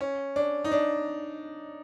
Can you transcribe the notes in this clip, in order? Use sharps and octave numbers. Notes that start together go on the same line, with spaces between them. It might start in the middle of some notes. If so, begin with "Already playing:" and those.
C#4
D4
D#4
D4